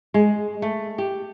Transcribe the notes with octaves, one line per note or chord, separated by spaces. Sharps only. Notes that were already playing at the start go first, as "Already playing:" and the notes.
G#3
A3
G4